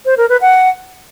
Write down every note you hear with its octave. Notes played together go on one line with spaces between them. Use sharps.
C5
A#4
B4
F#5